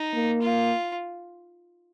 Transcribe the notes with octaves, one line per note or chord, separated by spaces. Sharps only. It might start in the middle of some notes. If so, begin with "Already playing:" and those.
Already playing: D#4
A#3
F4